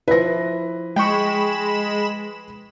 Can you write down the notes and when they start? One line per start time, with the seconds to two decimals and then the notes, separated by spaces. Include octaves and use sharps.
0.08 F3 E4 B4 A#6
0.96 G#3 G5 B5 C#6 E7